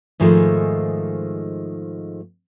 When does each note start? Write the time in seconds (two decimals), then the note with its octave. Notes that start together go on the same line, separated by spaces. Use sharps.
0.20 G#2 D#3 F3 G#3 A3